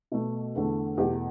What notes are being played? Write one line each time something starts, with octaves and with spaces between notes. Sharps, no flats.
B2 A3
E2 D3 A3
E2 B2 A3 G4